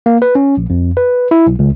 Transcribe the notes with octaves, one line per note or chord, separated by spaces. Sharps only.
A#3
B4
C#4
A#1
F2
B4
E4
B1
C#2